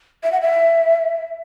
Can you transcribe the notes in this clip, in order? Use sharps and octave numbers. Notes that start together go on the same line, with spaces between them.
E5
F#5
E5